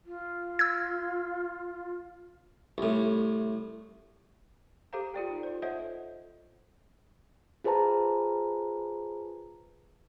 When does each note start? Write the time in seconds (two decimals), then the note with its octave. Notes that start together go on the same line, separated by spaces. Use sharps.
0.06 F4
0.59 E6 G#6
2.78 C2 A2
4.93 G4 A4 C5 F5 A#5
5.14 F4 A4 D5 G5
5.30 D#4
5.43 F4 C5
5.62 A4 C5 C#5 D#5 E5 F#5
7.64 F4 G#4 B4 C5 A5 A#5